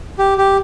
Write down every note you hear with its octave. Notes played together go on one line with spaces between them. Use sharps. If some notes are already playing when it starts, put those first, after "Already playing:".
G4
G4